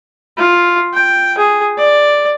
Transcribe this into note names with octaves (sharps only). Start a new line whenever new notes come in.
F4
G5
G#4
D5